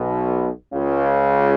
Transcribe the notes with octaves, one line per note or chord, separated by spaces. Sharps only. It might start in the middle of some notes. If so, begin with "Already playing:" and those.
Already playing: B1 B2
C#2 C#3